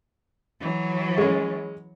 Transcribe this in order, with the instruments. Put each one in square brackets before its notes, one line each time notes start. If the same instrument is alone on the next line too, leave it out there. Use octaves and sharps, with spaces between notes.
[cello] E3 F#3
[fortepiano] G#3 C#4